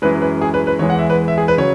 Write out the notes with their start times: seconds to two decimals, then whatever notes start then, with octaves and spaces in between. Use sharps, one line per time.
0.02 F#2 E3 G#3 B4
0.22 B4
0.42 G#4
0.54 B4
0.67 B4
0.79 E2 E3 G#3 C#5
0.90 F#5
0.99 E5
1.10 B4
1.28 E5
1.38 G#4
1.48 B4
1.58 C#3 F#3 C#5